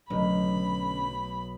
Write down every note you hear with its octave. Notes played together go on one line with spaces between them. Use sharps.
B1 D3 F#3 A3 C#4 B5